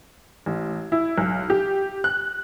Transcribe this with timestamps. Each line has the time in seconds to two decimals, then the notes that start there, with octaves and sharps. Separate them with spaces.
0.46 A1
0.92 E4
1.18 B1
1.50 G4
2.04 F#6